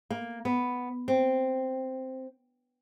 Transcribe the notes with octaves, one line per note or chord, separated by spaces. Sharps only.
A#3
B3
C4